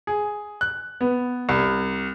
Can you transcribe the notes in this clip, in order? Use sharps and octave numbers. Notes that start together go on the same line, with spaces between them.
G#4
F#6
B3
C2